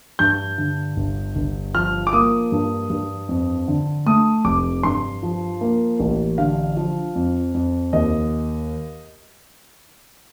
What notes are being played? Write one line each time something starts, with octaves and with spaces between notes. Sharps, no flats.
G2 G6
D3
G1
G1
F3 F6
D6
A#3 D#6
G2
G2
F2
D3
A3 D#6
F1 D6
G2 C6
F3
A#3
A1
D3 F5
F3
F2
F2
D#2 D#5